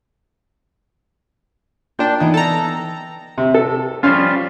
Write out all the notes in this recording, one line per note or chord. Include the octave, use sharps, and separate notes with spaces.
A#2 D4 G5
E3 B3 D#4 D7
A4 A#5
C3
A4
F3 G3 C#4 F4 F5